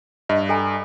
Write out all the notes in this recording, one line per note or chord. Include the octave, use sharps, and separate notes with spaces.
G2 D#5
A4 G#5 A#5